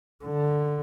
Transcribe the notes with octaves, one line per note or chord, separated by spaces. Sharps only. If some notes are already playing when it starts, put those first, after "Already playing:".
D3